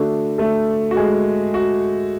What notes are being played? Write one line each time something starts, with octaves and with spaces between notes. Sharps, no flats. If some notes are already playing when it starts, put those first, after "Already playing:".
Already playing: D3 A3 D4 F#4
A3 A4
F#4
G#3 G#4
F#4